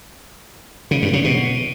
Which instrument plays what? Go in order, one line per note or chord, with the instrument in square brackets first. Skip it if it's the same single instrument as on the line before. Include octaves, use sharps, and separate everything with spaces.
[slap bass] C#3
G2
C#3
B2